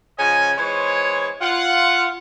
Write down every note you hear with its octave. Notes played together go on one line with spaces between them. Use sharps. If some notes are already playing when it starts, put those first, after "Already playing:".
C#3 F3 C#4 D#5 G#5
E3 G#3 C5 C#5
F4 F#5